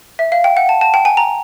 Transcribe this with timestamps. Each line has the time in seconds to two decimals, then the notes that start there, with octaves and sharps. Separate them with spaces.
0.19 E5
0.32 F5
0.44 G5
0.57 F#5
0.69 A5
0.81 A5
0.94 G5
1.05 G#5
1.17 A#5